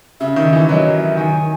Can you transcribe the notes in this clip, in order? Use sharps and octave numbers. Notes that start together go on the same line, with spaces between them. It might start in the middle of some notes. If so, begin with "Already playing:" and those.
C#3 E5
D#3
E3
F#3 D#5
E5
D#3 G#5
D#3